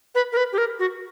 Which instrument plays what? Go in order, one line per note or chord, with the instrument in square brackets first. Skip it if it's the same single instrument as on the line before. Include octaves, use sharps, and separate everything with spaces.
[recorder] B4
A#4
B4
G4
A#4
F#4